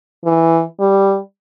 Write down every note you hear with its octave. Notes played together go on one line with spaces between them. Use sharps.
E3
G3